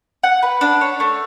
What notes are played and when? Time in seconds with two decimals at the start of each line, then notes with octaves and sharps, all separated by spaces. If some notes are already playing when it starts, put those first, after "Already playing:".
0.23 F#5
0.43 B4
0.61 D4
0.81 C#5
1.00 A3